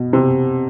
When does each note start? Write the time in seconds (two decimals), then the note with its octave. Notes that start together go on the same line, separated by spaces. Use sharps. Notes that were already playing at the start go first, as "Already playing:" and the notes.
Already playing: B2
0.13 C3